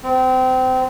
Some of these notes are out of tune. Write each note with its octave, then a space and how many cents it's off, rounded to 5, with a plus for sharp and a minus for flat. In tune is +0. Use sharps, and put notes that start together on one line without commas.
C4 -25